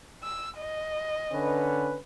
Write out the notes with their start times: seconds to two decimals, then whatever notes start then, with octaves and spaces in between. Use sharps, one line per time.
0.23 E6
0.58 D#5
1.32 D3 C#4 B4